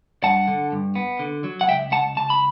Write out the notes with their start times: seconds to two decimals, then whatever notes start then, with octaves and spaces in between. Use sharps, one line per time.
0.23 G2 F#5 A5
0.47 D3
0.72 G2
0.95 B3
1.19 D3
1.44 F#3
1.61 F#5
1.68 C#2 E5 G5
1.91 C#2 F#5 A5
2.17 C#2 A5
2.30 B5